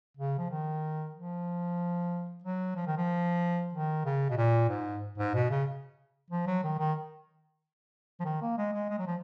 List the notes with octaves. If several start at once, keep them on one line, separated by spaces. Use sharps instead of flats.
C#3
F3
D#3
F3
F#3
F3
D#3
F3
D#3
C#3
B2
A#2
G#2
G#2
B2
C#3
F3
F#3
D#3
D#3
F3
D#3
A#3
G#3
G#3
G#3
F#3
F3